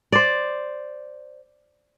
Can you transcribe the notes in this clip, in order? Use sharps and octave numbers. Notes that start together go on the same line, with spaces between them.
C5 D5